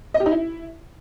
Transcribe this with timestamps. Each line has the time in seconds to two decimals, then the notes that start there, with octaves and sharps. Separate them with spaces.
0.14 D#5
0.20 G4
0.26 D#4
0.32 E4